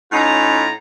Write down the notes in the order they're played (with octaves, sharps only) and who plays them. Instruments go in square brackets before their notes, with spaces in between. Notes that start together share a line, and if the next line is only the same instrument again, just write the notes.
[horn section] A2 C#4 D#4 F4 A#5